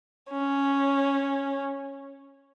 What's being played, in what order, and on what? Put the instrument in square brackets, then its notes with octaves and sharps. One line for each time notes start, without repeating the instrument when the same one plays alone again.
[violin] C#4